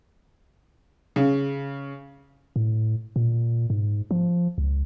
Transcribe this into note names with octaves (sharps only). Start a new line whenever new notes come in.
C#3
A2
A#2
G#2
F3
C#2